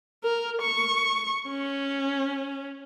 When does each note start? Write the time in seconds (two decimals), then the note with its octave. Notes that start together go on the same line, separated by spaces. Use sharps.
0.24 A#4
0.62 C#6
1.49 C#4